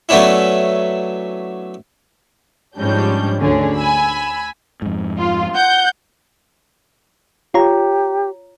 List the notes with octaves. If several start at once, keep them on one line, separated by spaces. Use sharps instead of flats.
F#3 A3 B3 C#4 D4 E4
G#2 F3 G3 C#4 D4 G6
D2 D3 C#4 G#4
G#5 B5 E6
F2 G#2
F4
F#5 G6
F4 G4 C#5 A#5